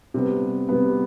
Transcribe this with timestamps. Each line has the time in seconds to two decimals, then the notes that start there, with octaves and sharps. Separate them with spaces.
0.14 C3 G3 B3
0.69 C3 G3 B3